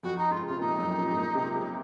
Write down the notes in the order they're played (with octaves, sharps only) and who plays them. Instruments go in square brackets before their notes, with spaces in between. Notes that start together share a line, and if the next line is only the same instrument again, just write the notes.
[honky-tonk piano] F2 [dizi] F#4
[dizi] D#4
[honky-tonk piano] G#2 [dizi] F4
[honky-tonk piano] C#3
[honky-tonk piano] C3 [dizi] F4
[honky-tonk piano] A#2 [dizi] D#4
[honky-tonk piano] F#2
A#2
G#2
A#2
C3
C#3